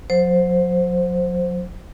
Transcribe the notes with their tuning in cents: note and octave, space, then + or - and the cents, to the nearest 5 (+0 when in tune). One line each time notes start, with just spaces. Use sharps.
F#3 -35 C5 +0